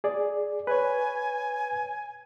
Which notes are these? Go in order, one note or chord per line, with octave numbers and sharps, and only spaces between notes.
G#4 D5
B4 C#5 G#5